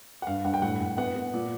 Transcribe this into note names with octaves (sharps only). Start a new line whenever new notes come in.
F#5
G2 F5
G2 F#5
G5
A2 F#5
A2
B3 F#5
B3
A#2